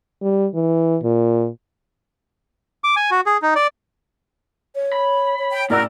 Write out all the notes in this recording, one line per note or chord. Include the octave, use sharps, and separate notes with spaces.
G3
E3
A#2
D6
G#5
F#4
G#4
D#4
D5
C#5
B5
C#5
G5
A2 C#3 F#4 A#4 D5 E6